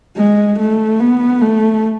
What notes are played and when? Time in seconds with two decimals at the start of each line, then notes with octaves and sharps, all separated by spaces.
0.16 G#3
0.59 A3
1.00 B3
1.41 A3